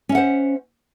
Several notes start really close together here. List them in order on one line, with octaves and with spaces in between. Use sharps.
C#4 E5 F#5 C5